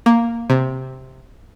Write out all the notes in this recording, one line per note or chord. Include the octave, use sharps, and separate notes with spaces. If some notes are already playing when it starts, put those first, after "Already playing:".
A#3
C3